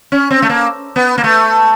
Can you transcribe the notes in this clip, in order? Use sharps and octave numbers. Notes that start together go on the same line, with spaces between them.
C#4
C4
A3
A#3
B3
A#3
A3